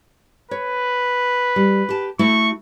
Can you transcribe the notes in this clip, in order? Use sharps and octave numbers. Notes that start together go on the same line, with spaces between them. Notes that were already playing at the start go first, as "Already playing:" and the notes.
B4 C#5
G3
G4 A5
A3 E4 F#4 C#6